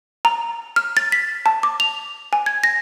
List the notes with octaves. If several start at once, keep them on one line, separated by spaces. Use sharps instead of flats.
A#5
F6
A6
B6
A5
D6
F7
G#5
G#6
A#6